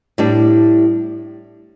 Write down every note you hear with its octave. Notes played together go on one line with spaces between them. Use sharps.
A2 G3 D4